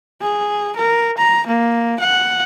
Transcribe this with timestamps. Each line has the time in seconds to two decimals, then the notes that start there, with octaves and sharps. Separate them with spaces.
0.21 G#4
0.76 A#4
1.17 A#5
1.47 A#3
2.00 F#5